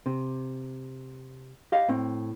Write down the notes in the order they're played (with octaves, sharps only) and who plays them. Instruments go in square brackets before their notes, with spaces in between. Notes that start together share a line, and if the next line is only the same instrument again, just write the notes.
[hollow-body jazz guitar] C3
G4 D#5 F5
A2 C4